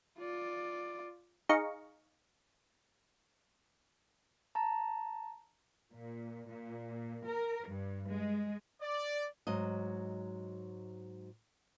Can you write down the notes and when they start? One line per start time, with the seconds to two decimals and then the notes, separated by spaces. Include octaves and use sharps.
0.18 F4 D5
1.49 D#4 G#4 D#5 F5 A#5 C#6
4.55 A5 A#5
5.93 A#2
6.50 A#2
7.27 A#4
7.68 G2
8.10 G#3
8.82 D5
9.47 G#2 F#3 D#5